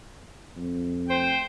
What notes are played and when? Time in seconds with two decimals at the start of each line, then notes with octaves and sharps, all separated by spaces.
0.57 F2
1.09 A3 C5 G5